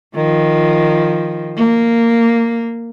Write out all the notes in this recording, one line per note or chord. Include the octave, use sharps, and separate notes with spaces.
D#3 F3
A#3